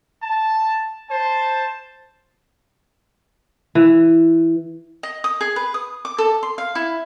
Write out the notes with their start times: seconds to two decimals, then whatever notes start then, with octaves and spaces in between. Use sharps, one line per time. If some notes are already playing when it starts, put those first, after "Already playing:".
0.22 A5
1.09 C5 A5
3.75 E3
5.03 D#5
5.24 D#6
5.41 G#4
5.56 B4
5.74 D#6
6.05 D6
6.18 A4
6.43 C6
6.58 F5
6.75 E4